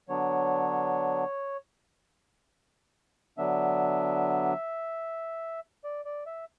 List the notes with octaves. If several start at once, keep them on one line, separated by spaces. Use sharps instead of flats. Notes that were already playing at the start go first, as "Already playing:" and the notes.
D3 F#3 B3 D4 C#5
D3 F#3 B3 D4 E5
D5
D5
E5